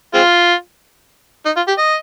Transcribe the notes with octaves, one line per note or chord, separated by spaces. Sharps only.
G#3 C4 F4
D#4
F4
G4
D#5